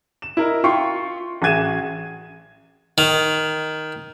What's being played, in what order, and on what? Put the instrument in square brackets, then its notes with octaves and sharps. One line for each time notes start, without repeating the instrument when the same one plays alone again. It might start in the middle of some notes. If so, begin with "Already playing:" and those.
[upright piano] E7
E4 A#4 D#5
E4 F4 G5 C6 C#6
A1 F#4 G#4 G#6 D#7 E7
[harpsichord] D#3